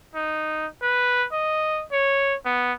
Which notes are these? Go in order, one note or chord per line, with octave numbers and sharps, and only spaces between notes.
D#4
B4
D#5
C#5
B3